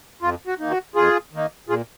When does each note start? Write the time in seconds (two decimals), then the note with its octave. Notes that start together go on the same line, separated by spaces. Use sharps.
0.22 F2 F4
0.47 F#4
0.59 D#3 A#3 D#4
0.71 F#4
0.95 F2 F4 G#4
1.33 D#3 A#3 D#4
1.69 A#2 F4 G#4